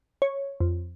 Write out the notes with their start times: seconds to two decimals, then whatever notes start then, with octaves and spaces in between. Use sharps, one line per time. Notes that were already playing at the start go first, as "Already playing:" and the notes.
0.22 C#5
0.60 F2